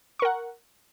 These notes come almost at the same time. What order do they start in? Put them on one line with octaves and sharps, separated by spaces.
C#6 A#4 F#5